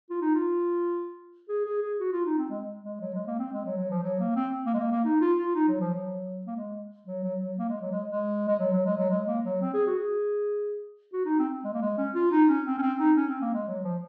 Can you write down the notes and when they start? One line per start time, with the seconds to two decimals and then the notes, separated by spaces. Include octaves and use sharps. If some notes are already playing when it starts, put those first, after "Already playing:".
0.10 F4
0.22 D#4
0.35 F4
1.49 G#4
1.66 G#4
1.82 G#4
2.00 F#4
2.13 F4
2.25 D#4
2.38 C4
2.50 G#3
2.84 G#3
3.01 F#3
3.14 G#3
3.27 A#3
3.39 C4
3.53 G#3
3.65 F#3
3.77 F#3
3.91 F3
4.03 F#3
4.20 A#3
4.36 C4
4.66 A#3
4.74 G#3
4.80 A#3
4.92 A#3
5.05 D#4
5.21 F4
5.38 F4
5.55 D#4
5.68 F#3
5.81 F3
5.94 F#3
6.47 A#3
6.56 G#3
7.07 F#3
7.24 F#3
7.41 F#3
7.58 A#3
7.69 G#3
7.81 F#3
7.92 G#3
8.09 G#3
8.48 G#3
8.60 F#3
8.73 F#3
8.85 G#3
8.98 F#3
9.11 G#3
9.28 A#3
9.45 F#3
9.61 C4
9.74 G#4
9.87 F#4
9.99 G#4
11.13 F#4
11.25 D#4
11.39 C4
11.64 G#3
11.74 A#3
11.82 G#3
11.98 C#4
12.15 F4
12.31 D#4
12.48 C#4
12.66 C4
12.78 C#4
12.82 C4
12.99 D#4
13.17 C#4
13.29 C4
13.41 A#3
13.54 G#3
13.67 F#3
13.84 F3